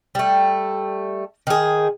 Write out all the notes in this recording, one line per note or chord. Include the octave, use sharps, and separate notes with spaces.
G3 A3
D#3 G#4